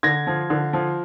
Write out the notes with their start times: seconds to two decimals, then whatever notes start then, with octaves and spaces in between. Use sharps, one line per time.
0.03 D3 G#6 A#6
0.27 F3
0.50 D3
0.73 F3